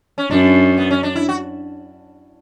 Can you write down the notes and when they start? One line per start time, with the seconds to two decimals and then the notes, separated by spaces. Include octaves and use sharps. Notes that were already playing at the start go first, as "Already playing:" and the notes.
0.18 C#4
0.30 F#2 D4
0.78 B3
0.91 C#4
1.03 D4
1.15 E4
1.29 F#4